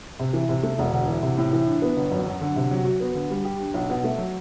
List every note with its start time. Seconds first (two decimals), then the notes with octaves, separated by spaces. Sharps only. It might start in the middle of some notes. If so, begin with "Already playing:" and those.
0.19 C3
0.33 E3
0.49 C3
0.63 A3
0.79 E1
0.92 D2
1.08 E3
1.23 C3
1.37 A2
1.53 E3
1.67 D4
1.82 B3
1.97 G1
2.12 F#2
2.27 F#3
2.41 D3
2.56 C3
2.71 F#3
2.85 F#4
3.00 B3
3.15 D3
3.30 G3
3.45 G4
3.59 D4
3.74 B1
3.90 B2
4.04 A3
4.18 F#3